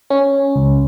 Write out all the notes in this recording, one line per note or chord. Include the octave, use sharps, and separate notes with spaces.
C#4
C#2